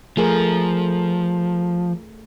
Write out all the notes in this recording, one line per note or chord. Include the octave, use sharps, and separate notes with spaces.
F3 A3 G#4 A#4